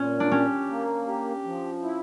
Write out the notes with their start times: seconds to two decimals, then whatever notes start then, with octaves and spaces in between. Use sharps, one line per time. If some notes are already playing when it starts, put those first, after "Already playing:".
Already playing: A#2 C#4
0.20 D4
0.31 C#4 G4
0.69 A#3
1.07 G4
1.44 F3
1.82 E4